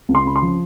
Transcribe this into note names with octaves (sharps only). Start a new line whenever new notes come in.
C#2
C6
C#3 B5
C6
F3